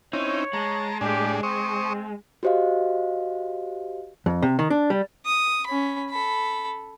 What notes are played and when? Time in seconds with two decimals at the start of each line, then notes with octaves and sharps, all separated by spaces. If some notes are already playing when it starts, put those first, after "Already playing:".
0.13 C4 C#4 D#4 E4 C#5
0.53 G#3 A5 A#5
1.01 A2 D4 G4 G#4
1.43 C4 C5 C#6 D#6
2.43 F#4 G4 C5 D#5 F5
4.26 F2
4.42 C3
4.59 D#3
4.70 D4
4.90 G3
5.26 D#6
5.67 C#4 B5
6.10 A4 B5